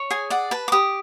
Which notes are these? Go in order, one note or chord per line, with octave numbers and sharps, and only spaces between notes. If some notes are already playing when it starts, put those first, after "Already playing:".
Already playing: C#5
G#4 G#5
D5 F#5
B4 A5
D6
G4 D#6